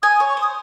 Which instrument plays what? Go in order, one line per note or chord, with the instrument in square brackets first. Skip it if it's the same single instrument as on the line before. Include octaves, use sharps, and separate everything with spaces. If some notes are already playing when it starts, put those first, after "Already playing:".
[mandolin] G#5 [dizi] D#6
[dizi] D#6
[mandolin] C#5
[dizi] C#6
[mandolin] C5 [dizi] D#6